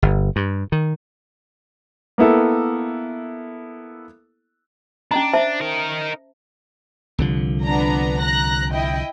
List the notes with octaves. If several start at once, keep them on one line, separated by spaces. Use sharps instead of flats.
G1
G2
D#3
A#3 B3 E4 A4
C#4 D4 D#5 A#5
C5 E5 A5
D#4 A#4
C2 D3 F3
B3 D4 A#5
A#5 F#6 A#6
E4 D#5 G5